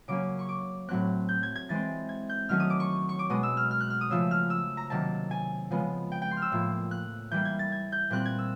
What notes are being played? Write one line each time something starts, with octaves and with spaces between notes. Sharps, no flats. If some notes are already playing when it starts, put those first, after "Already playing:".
C#3 F#3 A#3 C#4 D6
C#6
D6
A2 F#3 A3 C4 F#6
G6
G#6
G#6
E3 G#3 C4 A6
G#6
G6
D#3 F#3 A3 C#4 F6
D#6
D6
C#6
C#6
D6
B2 G#3 B3 D#6
E6
F6
F6
F#6
F6
D#6
C#3 F3 A3 E6
F6
E6
A#5
C3 D#3 F#3 A#3 A5
G#5
C#3 F3 G#3 B3
G5
G5
C6
F6
E6
A2 F3 A#3
F#6
E3 G3 A#3 G6
G#6
A6
G#6
G6
A#2 G3 C4 F#6
G#6
E6